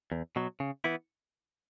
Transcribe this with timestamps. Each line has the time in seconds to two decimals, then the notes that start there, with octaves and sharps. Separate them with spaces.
0.12 E2
0.36 B2 F#3
0.60 C#3
0.84 E3 B3 E4